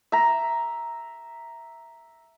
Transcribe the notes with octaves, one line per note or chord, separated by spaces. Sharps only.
E5 A#5